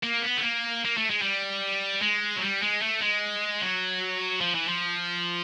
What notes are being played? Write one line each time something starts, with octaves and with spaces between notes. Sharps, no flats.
A#3
B3
A3
A#3
A#3
A3
G#3
G3
G#3
F#3
G3
G#3
A3
G#3
F#3
F3
E3
F3